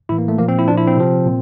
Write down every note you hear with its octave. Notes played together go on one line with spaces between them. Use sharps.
A2 E3 E4
A#3
A3
A#2 F3 A#3
C4
E4
A#2 F3 D4
E4
C4
C3 F3
A#2